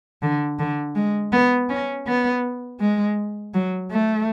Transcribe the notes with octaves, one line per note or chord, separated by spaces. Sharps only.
D3
D3
G#3
B3
C#4
B3
G#3
F#3
A3